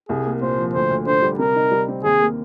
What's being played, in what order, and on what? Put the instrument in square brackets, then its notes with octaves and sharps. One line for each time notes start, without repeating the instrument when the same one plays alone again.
[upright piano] C2 [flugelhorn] G#4
[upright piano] A#3
[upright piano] A#2 [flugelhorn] C5
[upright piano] F3
[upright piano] D2 [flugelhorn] C5
[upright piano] D2
[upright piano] D3 [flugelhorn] C5
[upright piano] G3
[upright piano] C3 [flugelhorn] A#4
[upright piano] D#4
G3
C4
[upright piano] D#2 [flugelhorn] G#4
[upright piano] A#3